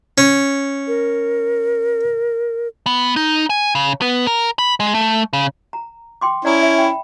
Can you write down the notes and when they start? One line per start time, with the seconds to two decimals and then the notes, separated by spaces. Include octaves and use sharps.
0.18 C#4
0.88 A#4
2.86 B3
3.16 D#4
3.50 G#5
3.75 C#3
4.02 B3
4.27 A#4
4.59 B5
4.80 G#3
4.94 A3
5.33 C#3
5.73 A#5
6.21 G5 C6 D6
6.45 C#4 E4 D5 A#5 D#6
6.62 E5
6.78 G5 B5